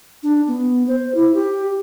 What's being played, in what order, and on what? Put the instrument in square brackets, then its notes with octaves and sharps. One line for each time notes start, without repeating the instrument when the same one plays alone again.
[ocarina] D4
B3
C5
E4
G4